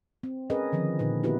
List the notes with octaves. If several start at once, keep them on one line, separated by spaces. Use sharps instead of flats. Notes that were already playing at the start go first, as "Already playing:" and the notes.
C4
C#4 G#4 A#4 B4 D#5
D3 D#3 F3 C4
A#2 D3 D#4 B4
B3 E4 F#4 G4 A#4 B4